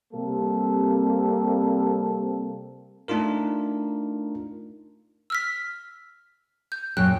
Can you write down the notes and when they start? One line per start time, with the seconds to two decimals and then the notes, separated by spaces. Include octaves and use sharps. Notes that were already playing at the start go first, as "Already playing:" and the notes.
0.14 C3 G3 A#3 C4 A4
3.08 A3 D4 D#4 F4 A#4
5.30 E6 F6 B6
6.72 G6
6.97 F#2 A#2 G5 F#6